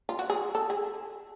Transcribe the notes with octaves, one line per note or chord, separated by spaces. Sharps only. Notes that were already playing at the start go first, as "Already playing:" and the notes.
F4
F#4
G#4
A4
G#4